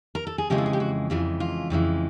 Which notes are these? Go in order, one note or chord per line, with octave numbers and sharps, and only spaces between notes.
A#4
A4
G#4
F2 C#3 E3 G#3 G4
A4
G#4
G4
F#4
F2 C#3 E3 G#3 F4
F4
F2 C#3 E3 G#3